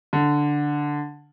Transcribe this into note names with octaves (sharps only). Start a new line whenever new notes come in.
D3